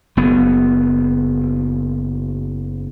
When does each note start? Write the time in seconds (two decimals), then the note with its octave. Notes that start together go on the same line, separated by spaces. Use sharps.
0.17 F#1 B3